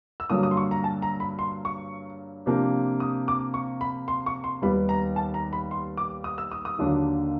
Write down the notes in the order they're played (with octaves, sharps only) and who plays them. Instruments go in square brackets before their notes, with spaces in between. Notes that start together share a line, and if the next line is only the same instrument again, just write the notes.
[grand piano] E6
[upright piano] G2 D3 F#3 A#3 [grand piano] D#6
[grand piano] D#6
C6
C#6
A#5
A5
A#5
B5
C6
C#6
[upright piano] C3 F3 A#3 D4 G4
[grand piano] D#6
D6
C#6
B5
C6
C#6
C6
[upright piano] D#2 D#3 G3 B3 [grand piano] B5
[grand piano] A#5
A5
A#5
B5
C6
D6
D#6
E6
D#6
D#6
[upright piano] D#2 D3 F#3 A#3 D4